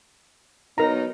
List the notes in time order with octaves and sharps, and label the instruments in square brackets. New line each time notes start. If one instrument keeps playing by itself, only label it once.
[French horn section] F#3 B3 D#4 [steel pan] A#4 A#5